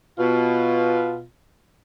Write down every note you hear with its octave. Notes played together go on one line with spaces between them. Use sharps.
B2 F4